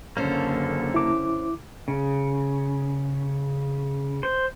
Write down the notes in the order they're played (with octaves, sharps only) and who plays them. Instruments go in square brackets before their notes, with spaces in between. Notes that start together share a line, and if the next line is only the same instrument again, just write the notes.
[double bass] F#1 D3 [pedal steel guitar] A#3 A4 [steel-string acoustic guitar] C#4 C5
[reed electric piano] E4 D6
[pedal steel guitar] C#3
C5